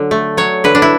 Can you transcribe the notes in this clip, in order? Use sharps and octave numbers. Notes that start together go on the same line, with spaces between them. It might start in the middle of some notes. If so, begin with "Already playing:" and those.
Already playing: D3 F#3
A3
F#3 C#5
D3 B4
D4
E4